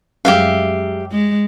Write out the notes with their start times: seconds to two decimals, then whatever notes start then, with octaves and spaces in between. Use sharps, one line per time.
0.25 F#2 G3 G#3 G4 E5 F5
1.11 G#3